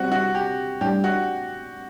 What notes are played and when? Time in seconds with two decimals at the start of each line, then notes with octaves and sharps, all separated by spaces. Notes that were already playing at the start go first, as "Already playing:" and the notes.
Already playing: C3 G3 C4 F#4
0.12 F#4
0.35 G4
0.81 A2 G3 D4 G4
1.04 F#4